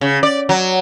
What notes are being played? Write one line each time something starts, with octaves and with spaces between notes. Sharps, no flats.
C#3
D5
F#3